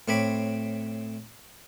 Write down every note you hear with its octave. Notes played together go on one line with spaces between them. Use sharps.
A2 C4 C#5 B5 D6